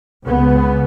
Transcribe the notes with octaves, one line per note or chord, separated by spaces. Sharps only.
C#2 C#3 B3